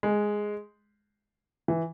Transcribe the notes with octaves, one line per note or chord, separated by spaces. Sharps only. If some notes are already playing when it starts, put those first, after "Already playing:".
G#3
E3